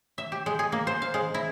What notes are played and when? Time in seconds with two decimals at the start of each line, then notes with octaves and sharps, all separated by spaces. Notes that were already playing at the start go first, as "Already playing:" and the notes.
0.18 E5
0.32 G4
0.46 G#3
0.59 G#4
0.72 A#3
0.87 C5
1.02 F5
1.14 G#3
1.34 E4